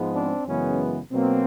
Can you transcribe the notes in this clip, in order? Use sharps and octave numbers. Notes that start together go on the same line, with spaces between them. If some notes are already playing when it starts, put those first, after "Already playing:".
Already playing: G#2 F3 G#3 B3
C4 D4
F#2 C#3 E3 G#3 B3 C#4
B2 F#3 A#3 C4